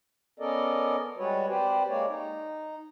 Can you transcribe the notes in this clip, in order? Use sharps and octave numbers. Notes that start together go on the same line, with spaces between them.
B3 C#4 A4 A#4 D5 D#5
G3 G#3 F#4 B4 C#5
C4 G4 B4 C5 D5
G#3 A#3 C#5 D5
D#4